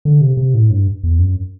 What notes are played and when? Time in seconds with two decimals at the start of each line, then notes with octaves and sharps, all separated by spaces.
0.05 D3
0.21 C3
0.37 C3
0.54 A2
0.70 G2
1.04 E2
1.19 F#2